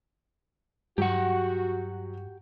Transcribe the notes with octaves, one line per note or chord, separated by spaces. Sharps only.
G2 F#3 F#4 G4 F#5